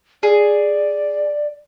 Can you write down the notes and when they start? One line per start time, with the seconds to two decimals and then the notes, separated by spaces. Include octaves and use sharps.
0.23 G#4 D5